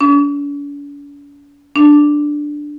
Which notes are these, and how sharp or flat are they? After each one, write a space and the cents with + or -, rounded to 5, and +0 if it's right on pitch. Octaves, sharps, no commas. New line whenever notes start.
D4 -45
D4 +5